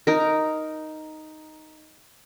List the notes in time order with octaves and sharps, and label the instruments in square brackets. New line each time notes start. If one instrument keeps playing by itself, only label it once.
[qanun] D#4 A#4